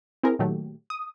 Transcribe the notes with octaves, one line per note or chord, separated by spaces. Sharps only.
C4 E4 G#4 A#4
A#2 D#3 F#3 A3 G4
D#6